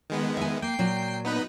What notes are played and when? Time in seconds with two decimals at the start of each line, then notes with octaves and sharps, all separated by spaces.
0.10 D#3 G#3 B3
0.37 E5 G#5
0.62 A#3 G5 C7
0.79 A#2 F#3 F#4
1.25 B3 D#4 B4